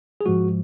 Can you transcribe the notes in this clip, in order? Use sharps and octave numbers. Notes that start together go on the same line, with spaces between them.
G#4
G#2 F3 G#3 F#4